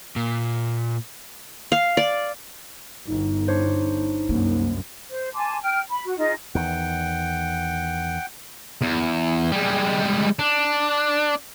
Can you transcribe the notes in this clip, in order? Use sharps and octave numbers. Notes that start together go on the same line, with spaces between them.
A#2
F5
D5
G1 D#4
D4 C5 C#5
C2 F#2 A#3
C5
G#5 A5 C6 D6
G5 F6
B5
F#4
D#4 F4 G#4 D#5
E2 D#3 F#5 G5
E2
G3 G#3
D4